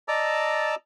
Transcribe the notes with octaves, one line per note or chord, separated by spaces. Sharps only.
D5 D#5 A5 A#5 D6 E6